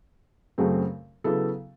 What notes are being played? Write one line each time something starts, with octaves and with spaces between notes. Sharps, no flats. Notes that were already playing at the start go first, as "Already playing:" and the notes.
F#2 C#3 F#3 A3 C4
C#3 F#3 B3 E4 A4